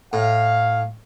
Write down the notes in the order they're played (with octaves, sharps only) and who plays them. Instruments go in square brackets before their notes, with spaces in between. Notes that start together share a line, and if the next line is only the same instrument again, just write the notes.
[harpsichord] A2 [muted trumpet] F5